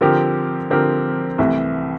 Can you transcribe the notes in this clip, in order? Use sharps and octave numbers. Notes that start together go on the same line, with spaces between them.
D3 F3 C4 G4 A#4
D3 F3 C4 G4 A#4
C2 C3 E3 A3